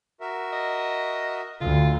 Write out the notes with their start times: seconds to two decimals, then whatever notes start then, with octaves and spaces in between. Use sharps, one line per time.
0.21 F#4 A#4 E5
0.53 D#5
1.61 D2 F4